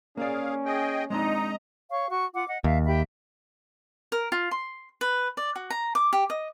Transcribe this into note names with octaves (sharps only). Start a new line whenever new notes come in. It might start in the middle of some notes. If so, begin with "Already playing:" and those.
A#3 C#4 G#4 D5 F5
G#4 D#5 G5
G#3 C4 D4 D#4 D#5 A#5
C#5 F5 C#6
F#4 C#6
F4 F#5 D6
D#5 F#5
D#2 E5 F5
G4 E5 B5
A#4
F4
C6
B4
D5
F#4
A#5
D6
G4
D#5